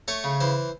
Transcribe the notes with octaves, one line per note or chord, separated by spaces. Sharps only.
A3 C#5
C#3
E3 C5